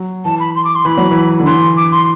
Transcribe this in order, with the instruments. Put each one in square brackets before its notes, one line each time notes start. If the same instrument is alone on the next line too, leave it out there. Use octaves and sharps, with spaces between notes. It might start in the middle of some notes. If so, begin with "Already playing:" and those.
Already playing: [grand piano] F#3
[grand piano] E3 [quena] A5
[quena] B5
C6
D6
C6
[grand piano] E3 [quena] B5
[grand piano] F#3
E3
D3
[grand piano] E3 [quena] C6
[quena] D6
C6